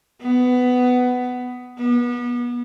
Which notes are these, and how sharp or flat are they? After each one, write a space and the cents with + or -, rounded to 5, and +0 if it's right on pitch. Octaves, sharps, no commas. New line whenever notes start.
B3 +15
B3 -30